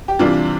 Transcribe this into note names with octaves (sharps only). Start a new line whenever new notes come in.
G4
C3 E3 G3 D4 F4